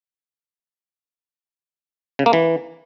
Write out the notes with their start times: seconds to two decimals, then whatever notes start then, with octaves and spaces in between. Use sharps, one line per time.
2.19 C#3
2.26 A#3
2.33 E3